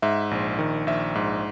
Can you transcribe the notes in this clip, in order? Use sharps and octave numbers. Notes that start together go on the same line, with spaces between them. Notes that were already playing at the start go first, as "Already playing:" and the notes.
G#2 E5
A#1
D#3
A#1 E5
G#2